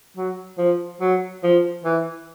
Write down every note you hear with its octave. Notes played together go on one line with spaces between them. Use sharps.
F#3
F3
F#3
F3
E3